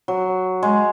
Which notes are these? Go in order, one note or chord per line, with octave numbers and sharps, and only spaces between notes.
F#3
G#3